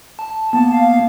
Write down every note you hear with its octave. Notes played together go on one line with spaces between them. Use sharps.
A5
A#3 B3 A5
F5